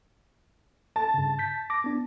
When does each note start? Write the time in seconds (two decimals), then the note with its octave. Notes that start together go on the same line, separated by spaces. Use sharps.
0.96 A5
1.14 G2 C#3
1.39 G6 B6
1.70 D6 A#6
1.84 B3 D4